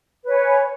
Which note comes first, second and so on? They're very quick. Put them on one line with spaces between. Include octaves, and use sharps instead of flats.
B4 C#5 G#5